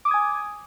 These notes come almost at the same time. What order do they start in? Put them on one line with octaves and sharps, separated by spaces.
D6 D#6 G#6 G#5